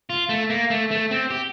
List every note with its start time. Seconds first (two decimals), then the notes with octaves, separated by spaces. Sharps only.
0.10 F4
0.29 A3
0.50 A#3
0.70 A3
0.91 A3
1.11 C4
1.30 G4